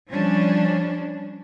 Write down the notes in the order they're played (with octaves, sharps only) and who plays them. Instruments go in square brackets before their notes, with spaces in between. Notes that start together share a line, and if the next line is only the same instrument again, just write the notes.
[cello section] F3 G3 C#4 D4